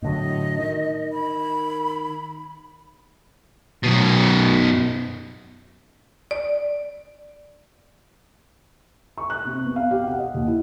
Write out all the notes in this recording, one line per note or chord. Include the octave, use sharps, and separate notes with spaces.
A2 D3 F#3 D#5
D#3
B5
F#2 B2
D5
C#6
F#6
C3
B3
F5
G4
F#5
D#5
D#2
E4